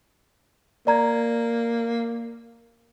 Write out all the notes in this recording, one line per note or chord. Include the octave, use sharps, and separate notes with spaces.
A#3 D5 A#5 G#6